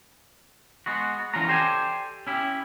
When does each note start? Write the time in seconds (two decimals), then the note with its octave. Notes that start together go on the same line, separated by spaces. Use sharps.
0.86 G#3 B3 F#4
1.34 E3 C#4 D4 F4 F#4 A#5
1.48 G4 A4 C5 D5 G5 G#5
2.27 C#4 E4 G4